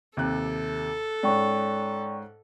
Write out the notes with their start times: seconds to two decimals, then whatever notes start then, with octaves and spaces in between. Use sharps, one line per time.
0.17 D#2 C3 A4 F#6
1.23 G#2 C#4 D5 G5 C#6